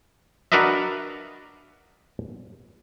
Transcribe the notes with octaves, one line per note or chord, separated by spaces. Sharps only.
D4 F#4 A#4 B4 D#5 E5